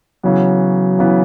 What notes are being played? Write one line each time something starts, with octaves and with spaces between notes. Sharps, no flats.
C#3 E3 F#3 B3
C#3 E3 B3